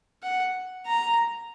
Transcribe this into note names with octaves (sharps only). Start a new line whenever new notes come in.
F#5
A#5